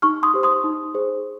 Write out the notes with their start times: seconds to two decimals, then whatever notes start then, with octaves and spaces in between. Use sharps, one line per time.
0.02 D#4 C#6 F6
0.23 C6 D#6
0.34 G4 C5
0.43 C6 D#6
0.64 D#4
0.94 G#4 C5